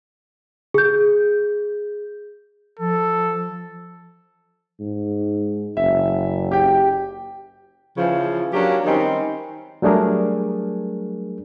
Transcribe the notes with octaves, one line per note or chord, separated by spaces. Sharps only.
G#4 G6
F3 A4
G#2
F#1 E5
G4 G5
C#3 E3 F3
F#3 A#3 C#4 D4 G4
D#3 G3 C4 C#4 D#4
F#3 G3 A3 D4 G#4 A#4